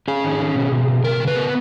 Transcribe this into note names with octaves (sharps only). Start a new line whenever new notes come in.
C#4 G#4
D#3
C#4
B2
B2
B2
C#3 A#4
C#3
B4
B3